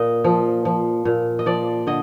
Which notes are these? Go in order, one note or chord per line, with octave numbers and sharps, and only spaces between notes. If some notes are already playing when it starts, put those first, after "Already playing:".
Already playing: A#2 D#5
F3
F3
A#2
D#5
F3 D5
D3 D#5